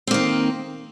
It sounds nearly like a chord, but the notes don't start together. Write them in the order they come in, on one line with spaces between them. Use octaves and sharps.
C4 A#3 D#3